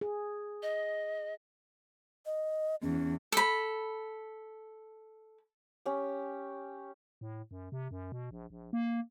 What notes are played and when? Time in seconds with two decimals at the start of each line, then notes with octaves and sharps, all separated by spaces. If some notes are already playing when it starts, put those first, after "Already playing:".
0.01 G#4
0.63 D#5
2.26 D#5
2.82 E2 C#4
3.32 A4 B5
5.86 C#4 G4
7.21 A2
7.51 F#2
7.72 C3
7.91 F#2
8.12 B2
8.31 A#1
8.50 A#1
8.73 A#3